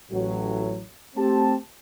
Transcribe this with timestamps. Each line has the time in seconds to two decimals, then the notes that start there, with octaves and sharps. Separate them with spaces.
0.11 A1 A2 F#3
1.16 A3 C4 G4 A5